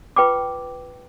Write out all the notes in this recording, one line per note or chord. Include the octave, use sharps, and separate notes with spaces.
F4 B4 G5 C#6 D6